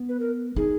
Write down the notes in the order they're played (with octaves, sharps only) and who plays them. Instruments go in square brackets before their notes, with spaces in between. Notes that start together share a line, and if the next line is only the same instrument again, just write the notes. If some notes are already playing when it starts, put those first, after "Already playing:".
Already playing: [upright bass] B3
[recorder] B4
A#4
[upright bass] D#4 [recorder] G#4